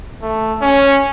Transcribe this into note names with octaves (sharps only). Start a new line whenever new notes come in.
A3
C#4